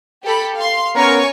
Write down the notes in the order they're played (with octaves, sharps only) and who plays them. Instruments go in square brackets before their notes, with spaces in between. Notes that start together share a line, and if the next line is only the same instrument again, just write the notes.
[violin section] G4 A4 B5
F5 C6
[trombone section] B3 C#4 A#4 [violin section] C#5 G#5 C#6